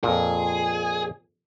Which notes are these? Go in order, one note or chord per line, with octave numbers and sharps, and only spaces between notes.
F2 A#2 G#4